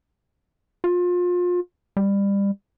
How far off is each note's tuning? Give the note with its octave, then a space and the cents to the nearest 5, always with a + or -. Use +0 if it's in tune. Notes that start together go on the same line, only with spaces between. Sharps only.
F4 +30
G3 +25